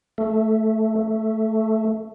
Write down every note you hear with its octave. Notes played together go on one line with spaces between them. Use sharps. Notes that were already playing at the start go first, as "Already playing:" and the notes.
A3
A3